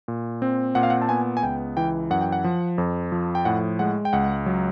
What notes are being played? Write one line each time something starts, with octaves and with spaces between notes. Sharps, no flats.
A#2
C4
A#2 F#5
F5
F#5
A5
B3 G#5
G#5
C#2 G5
E3 G5
F#2 F#5
G5
F#5
F3
F2
F3
G5
A2 F#5
G#3 F#5
G5
C#2 F#5
F#3